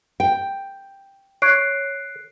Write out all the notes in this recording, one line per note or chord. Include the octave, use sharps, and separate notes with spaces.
G5
C#5 F#6 C7 D7